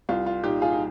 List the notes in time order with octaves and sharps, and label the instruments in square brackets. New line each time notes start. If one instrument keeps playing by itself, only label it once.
[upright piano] C2 F4
F4
A#2 D#4 G4
F4 G#4
D#4